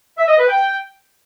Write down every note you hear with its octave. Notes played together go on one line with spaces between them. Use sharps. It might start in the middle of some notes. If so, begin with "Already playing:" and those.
E5
D#5
B4
G5